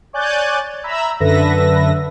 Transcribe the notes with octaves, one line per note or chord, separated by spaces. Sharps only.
C#5 D5 G#5 F#6 G6 A6
E5 A#5 B5 E6
F#2 D3 A4 B4 E5 A#6